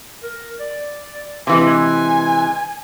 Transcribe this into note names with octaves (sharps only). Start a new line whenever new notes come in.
A#4
D5
C3 E3 G#3 G#5